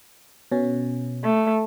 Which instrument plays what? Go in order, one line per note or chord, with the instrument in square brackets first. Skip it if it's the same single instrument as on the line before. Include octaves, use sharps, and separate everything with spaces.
[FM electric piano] B2 C#4
[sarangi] A3